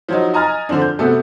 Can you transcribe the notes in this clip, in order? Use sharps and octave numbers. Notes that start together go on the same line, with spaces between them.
F3 F#3 D#4
D#5 G#5 A#5 F6 A6
D3 F3 C4 D4
G6
C3 A3 B3 F#4 A4